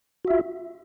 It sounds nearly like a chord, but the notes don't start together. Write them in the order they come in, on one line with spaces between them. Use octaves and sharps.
F#4 E5 F4